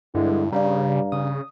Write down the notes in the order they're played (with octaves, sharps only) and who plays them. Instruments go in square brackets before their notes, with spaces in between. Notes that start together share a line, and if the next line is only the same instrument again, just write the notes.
[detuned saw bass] G2 [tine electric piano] D3 G#3 [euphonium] E4
[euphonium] G2 [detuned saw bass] C#3 [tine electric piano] G3 [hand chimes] D5 F5 A#5
[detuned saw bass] C#3 [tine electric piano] D#6